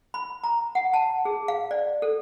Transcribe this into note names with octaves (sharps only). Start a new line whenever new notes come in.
B5
A#5
F#5
A5
G#4
F5
D5
A4